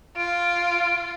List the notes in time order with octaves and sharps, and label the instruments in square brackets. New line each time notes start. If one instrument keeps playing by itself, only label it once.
[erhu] F4 [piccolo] D7